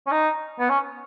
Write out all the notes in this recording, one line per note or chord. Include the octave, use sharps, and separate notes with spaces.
C#4
D#4
B3
C#4